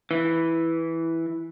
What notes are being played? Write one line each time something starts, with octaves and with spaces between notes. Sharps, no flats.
E3